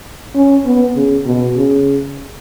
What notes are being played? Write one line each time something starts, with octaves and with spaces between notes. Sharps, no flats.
C#4
B3
C#3
B2
C#3